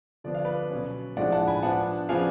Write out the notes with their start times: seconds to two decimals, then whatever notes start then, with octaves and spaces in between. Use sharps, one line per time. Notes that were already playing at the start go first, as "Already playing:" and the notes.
0.24 D3 F3 B3 D4 D5
0.35 F5
0.45 B4 D5
0.71 B2 F#3 C#4
1.17 A2 F3 G#3 D4 D5 F#5
1.32 F#5 A5
1.47 G#5 B5
1.62 F3 B3 D4 F#5 A5
2.09 C#3 F3 B3 D4 F5 G#5